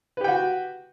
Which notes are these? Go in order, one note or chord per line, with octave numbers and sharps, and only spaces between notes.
F#4 G4 B4 G5